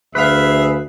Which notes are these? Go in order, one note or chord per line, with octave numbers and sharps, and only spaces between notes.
D2 G#4 B4 E5 F5